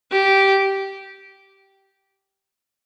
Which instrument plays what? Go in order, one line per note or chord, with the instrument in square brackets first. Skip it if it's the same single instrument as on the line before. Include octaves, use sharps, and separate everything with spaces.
[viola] G4